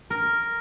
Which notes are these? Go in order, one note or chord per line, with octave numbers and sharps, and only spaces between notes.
A#4